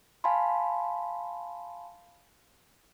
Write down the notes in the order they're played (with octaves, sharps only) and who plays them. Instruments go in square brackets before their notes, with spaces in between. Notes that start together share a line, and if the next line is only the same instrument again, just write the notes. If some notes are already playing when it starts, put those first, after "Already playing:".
[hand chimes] F5 G#5 A5 B5 C6